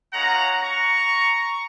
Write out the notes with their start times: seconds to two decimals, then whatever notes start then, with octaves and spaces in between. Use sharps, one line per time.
0.13 G#3 C#4 F4 F#5 A#5
0.62 A#5 C#6